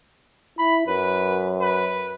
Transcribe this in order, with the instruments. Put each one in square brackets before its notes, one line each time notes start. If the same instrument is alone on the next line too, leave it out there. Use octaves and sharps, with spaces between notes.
[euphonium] E4 [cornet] B5
[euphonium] F#2 [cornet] B4
[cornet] B4